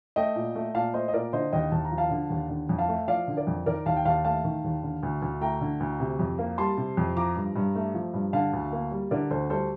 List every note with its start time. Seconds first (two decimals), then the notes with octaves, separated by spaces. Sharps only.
0.16 A3 D#5 G5
0.36 A#2
0.55 A3
0.74 A#2 F5 A5
0.94 A3 C5 D#5
1.08 D#5
1.14 A#2 A#4 D5
1.33 D3 C5 D#5
1.52 D#2 D#5 G5
1.72 D#2 A5
1.85 A#5
1.92 F3
1.98 F5 A5
2.11 D3
2.30 D#2
2.50 D3
2.69 F2
2.78 F5 A5
2.88 A3
3.08 F3 D5 F5
3.28 D3
3.37 A#4 D5
3.47 F2
3.66 D#3 A#4 D5
3.86 D#2 F5 A5
3.96 G5
4.05 D#2 F5 A5
4.25 A3 F5 A5
4.44 D#3
4.64 D#2
4.83 D3
5.03 D2
5.22 D2
5.41 A3 G5 A#5
5.61 D3
5.80 D2
6.00 C3
6.19 F2
6.39 A#3
6.58 G3 A5 C6
6.77 C3
6.97 F2
7.16 F3 A#5 D6
7.36 G2
7.56 G2
7.75 A3
7.94 F3
8.14 G2
8.33 D3 F5 A5
8.53 D2
8.72 A#3
8.91 G3
9.11 D3 A#4 D5
9.31 D2 A4 C5
9.50 G3 A4 C5